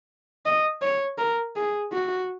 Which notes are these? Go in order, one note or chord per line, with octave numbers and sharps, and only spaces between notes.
D#5
C#5
A#4
G#4
F#4